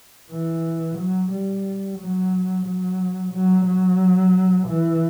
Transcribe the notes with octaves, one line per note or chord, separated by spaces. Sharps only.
E3
F#3
G3
F#3
F#3
F#3
F#3
E3